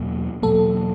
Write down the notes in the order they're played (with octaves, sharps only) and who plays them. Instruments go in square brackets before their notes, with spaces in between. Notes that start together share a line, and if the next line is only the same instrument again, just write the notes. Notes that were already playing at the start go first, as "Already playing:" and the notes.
Already playing: [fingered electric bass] E2 B2 F#3 A#3
[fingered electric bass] E2 B2 F#3 A#3 [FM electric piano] A4